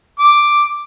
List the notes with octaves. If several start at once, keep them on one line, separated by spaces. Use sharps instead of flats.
D6